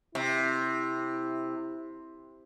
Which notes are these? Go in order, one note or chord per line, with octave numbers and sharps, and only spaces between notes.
C3 E4